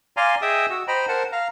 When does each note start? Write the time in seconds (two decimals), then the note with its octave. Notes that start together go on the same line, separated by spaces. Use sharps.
0.17 D5 F5 G#5 A#5 C6
0.42 G#4 D#5 E5 G5 D#6 E6
0.70 F#4 E6
0.88 C5 D#5 G5 A#5 B5
1.08 A#4 C5 F#5 A5
1.32 F5 A#5